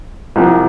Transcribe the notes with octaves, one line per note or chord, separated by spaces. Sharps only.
C2 C3 F3